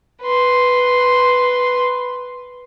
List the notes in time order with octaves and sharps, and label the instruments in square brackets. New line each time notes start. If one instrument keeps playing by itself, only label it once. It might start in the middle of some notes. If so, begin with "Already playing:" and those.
[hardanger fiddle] B4 C6